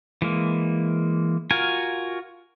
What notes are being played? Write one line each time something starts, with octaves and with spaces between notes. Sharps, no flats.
E3 G#3 A#3
F4 F#4 A#4 G#5